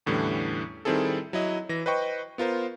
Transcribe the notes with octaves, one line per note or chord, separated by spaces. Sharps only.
E2 A2 D3 E3 G3 C#4
D#3 G3 C4 E4 G#4 A4
F#3 E4 D#5
E3 A#6
B4 C5 D#5 G5 C#6
B3 F4 A#4 C5